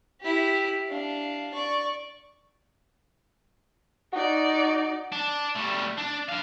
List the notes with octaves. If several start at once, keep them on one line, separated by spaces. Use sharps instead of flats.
E4 G4
D4 F5
D5 C#6
D#4 F#4 D5
D4
G3 A3
D4
D4 F5